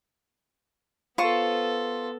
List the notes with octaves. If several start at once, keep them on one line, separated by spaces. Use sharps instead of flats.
B3 F4 A4 C5 C#6